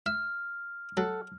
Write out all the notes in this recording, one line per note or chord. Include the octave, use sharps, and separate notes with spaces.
E5 F6
F#3 A4 F#5